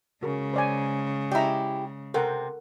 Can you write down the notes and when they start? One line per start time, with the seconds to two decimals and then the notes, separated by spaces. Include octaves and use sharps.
0.23 C#3 G#3 F#4 G#4 A#4
0.54 C5 D5 G#5
1.31 E4 G4 D5 D#5 A#5
2.14 C3 C4 A4 A#4 F#5